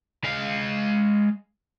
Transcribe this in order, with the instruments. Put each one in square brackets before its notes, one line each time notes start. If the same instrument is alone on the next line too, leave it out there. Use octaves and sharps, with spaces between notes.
[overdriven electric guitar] G#3 F5